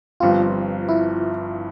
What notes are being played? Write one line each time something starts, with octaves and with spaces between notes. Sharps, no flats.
G1 G2 F3 C4 F4
E4